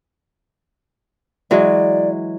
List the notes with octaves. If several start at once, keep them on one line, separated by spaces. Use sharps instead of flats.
E3 F#3 G#3 D5